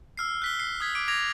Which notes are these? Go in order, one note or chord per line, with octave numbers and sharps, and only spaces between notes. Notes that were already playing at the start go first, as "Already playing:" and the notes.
E6 F6 C7
F#6 B6 G7
C7
D#6 G#6 B6
D6 D7
D6 G#6 A#6 F7